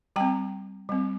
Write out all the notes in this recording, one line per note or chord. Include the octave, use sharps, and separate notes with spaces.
G3 C4 G5 A#5
G3 C4